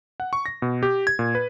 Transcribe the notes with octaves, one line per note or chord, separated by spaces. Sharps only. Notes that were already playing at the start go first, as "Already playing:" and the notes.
F#5
C#6
A#6
B2
G4
G#6
A#2
B4